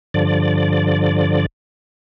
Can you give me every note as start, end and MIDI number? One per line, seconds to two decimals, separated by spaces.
0.14 1.46 43
0.14 1.46 50
0.14 1.46 53
0.14 1.46 74